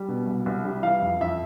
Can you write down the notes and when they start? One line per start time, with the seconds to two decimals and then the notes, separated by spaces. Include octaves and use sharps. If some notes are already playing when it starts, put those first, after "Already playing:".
Already playing: G3
0.08 B2
0.27 C2
0.46 C2
0.65 G3
0.83 E3 F5
1.02 F2
1.21 F2 E5